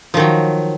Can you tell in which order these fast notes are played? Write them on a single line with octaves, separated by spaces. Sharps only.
F3 D#3 F#3